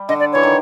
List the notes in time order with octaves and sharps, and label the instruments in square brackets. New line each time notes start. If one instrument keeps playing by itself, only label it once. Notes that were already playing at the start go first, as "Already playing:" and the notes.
Already playing: [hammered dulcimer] G3
[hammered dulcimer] D3 [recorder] D#5
[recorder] D5
[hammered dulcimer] E3 [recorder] C#5
[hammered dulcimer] D#3